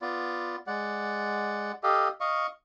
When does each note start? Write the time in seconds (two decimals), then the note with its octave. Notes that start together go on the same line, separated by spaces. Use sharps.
0.02 B3 F4 D5
0.67 G#3 D5 F#5
1.83 G4 A4 D#5 F5
2.20 D#5 F5 C#6